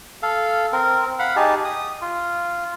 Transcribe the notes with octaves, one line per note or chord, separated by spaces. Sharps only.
A4 F5
C4 A#4
F5 F#5 B5
D#4 G4 G#4 A5
D#6
F4